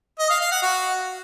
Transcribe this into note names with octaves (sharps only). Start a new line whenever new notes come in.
D#5
F5
F5
F#5
F#4